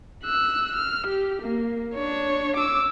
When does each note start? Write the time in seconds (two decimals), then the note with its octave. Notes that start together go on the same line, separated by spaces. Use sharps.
0.24 E6 F#6
0.76 F6
1.07 G4
1.42 A#3
1.94 D4 C#5
2.57 D6 E6